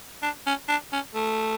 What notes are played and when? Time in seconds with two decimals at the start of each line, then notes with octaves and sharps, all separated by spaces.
0.22 D4
0.47 C#4
0.68 D4
0.92 C#4
1.15 A3